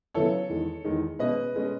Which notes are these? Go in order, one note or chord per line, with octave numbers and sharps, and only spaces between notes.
C#3 F#3 B3 E4 A4 C#5
E2 D#3 G#3
E2 D#3 G#3
B2 G#3 C#4 B4 D#5
B2 G#3 C#4